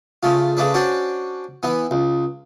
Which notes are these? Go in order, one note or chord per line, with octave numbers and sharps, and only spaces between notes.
C#3 A3 F4
C#3 A3 D4 B4
C#4 D4 F#4 C5 D5
E3 B3
C#2